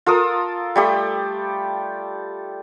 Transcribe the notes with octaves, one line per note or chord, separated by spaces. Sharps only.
F4 A4 A#4 D#6
G3 A3 G4